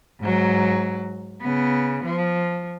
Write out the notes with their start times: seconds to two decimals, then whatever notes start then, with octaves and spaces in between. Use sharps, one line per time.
0.20 G#2 F#3
1.42 C#3 B3
2.04 F3